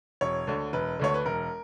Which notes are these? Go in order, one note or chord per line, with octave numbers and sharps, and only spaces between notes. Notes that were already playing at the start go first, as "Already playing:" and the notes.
E1 C#5
D2 D3
E1 B4
D2 D3 C#5
B4
E1 A#4